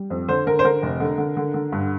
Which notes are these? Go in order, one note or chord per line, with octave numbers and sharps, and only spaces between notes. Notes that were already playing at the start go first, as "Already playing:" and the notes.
Already playing: G3
F2
D3 C5
D3 A#4
C5
D3 A#4
F1
D3
D3
D3
D3
G2